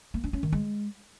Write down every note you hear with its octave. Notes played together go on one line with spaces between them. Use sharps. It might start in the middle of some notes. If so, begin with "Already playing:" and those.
A#3
D4
C#4
D#3
G#3